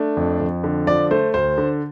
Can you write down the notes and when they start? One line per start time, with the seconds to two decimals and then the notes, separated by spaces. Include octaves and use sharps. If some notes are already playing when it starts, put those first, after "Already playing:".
Already playing: A3 D4
0.17 F2
0.40 F2
0.64 D3
0.87 F3 D5
1.11 A3 C5
1.34 D2 C5
1.58 D3